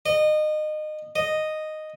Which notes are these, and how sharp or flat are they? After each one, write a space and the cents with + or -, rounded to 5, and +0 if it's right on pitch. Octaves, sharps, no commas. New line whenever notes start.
D#5 -25
D#5 -5